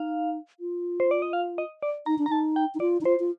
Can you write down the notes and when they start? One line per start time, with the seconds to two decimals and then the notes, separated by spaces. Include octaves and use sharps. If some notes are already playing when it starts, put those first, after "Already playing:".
Already playing: D#4 F5
0.60 F4
1.00 C5
1.11 D5
1.22 D#5
1.33 F5
1.58 D#5
1.83 D5
2.06 D#4 A#5
2.18 D4
2.26 A#5
2.29 D#4 A5
2.56 G5
2.75 D#4
2.80 F4 D5
3.01 D#4
3.05 F4 C5
3.20 F4